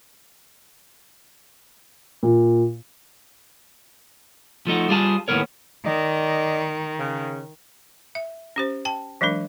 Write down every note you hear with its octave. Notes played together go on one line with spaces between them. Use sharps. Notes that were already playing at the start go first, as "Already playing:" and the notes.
A#2
F3 A3 D#4 F#4
G3 F4 G#4 A5
D#2 A2 F#3 B3 A#4 C#5
D#3 D5 D#5
C#3
E5
C#4 G4 C5
G5 A5
E3 F#3 G#3 D4 A#4